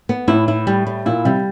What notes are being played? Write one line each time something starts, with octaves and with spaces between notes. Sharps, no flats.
B3
A2 E4
E4
G3
G3
A#2 E4
C3 G3